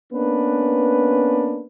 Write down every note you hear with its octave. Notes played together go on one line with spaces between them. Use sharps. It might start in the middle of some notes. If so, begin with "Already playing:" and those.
A#3 B3 C#4 D4 B4